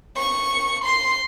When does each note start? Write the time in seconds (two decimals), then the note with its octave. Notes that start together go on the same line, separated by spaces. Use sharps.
0.17 C#6
0.84 C6